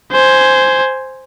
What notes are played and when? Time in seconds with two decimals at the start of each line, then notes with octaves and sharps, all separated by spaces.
0.12 C5 G#5